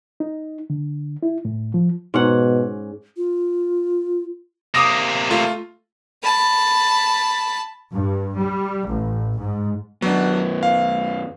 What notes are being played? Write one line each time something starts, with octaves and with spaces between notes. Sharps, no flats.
D#4
D3
E4
A2
F3
G#2 B2 C#4 F#5
F4
C3 A#3 D6 D#6 A#6
A3 F4
A5 B5
G2
G3
A1
G#2
F#2 F#3 B3 D4
F5